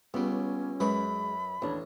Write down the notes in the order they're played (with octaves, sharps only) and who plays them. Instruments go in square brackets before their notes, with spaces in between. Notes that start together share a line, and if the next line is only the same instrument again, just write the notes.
[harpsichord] C#2 G3 [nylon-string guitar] B3 [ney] C#4
[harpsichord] F#2 B4 C#6 [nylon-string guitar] G#3 [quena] B5
[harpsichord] A1 [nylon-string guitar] D#2 D4 [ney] C#5